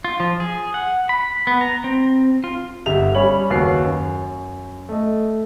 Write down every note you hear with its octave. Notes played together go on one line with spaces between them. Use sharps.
F4
F3
G#4
F#5
B5
B3
A#5
C4
F4
G1 G4 E5 F7
G3 C#4 C#5 B5 F#7
F#1 D#2 F#4 B4 C7
F#2
A3 D#5